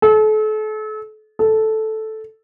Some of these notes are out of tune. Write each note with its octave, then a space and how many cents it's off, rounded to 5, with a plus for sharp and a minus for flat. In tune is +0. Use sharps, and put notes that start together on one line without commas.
A4 -35
A4 -5